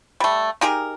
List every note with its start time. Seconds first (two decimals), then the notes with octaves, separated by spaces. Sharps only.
0.20 G3 A3
0.61 D#4 G4 G#4 A#4